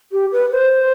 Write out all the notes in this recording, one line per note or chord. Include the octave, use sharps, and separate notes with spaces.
G4
B4
C5